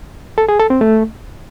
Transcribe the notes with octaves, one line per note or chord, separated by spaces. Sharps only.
A4
G#4
A4
C4
A3